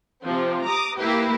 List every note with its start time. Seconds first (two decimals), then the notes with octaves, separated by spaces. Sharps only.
0.24 C3 F3 C4
0.67 A#5 D6 D#6
0.98 A#3 E4 G4 B4